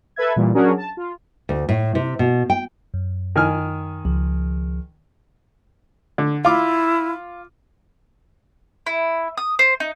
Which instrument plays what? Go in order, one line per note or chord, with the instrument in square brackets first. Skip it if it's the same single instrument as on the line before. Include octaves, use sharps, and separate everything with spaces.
[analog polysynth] A4 B4 E5 G#6
A#2 E3 G3
F#3 C#4 D4 F#4 G#4 A#4
A5
F4
[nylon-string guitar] D2
A2
C3
B2
G5
[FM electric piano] F#2
[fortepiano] D#3 G#5 F6
[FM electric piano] C#2 F3
[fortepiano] D3
[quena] E4 [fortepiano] F4 D6
[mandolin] E4
D#6
C5
D#4